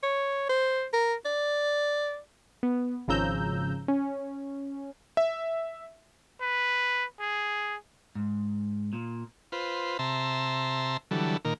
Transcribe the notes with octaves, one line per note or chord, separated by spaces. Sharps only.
C#5
C5
A#4
D5
B3
G#1 C#3 F3 A#5 E6 G6
C#4
E5
B4
G#4
G#2
A#2
F4 B4 C5
C3 E5 A5 A#5 C6
D3 E3 F#3 G3 A4
A#2 D#3 A#4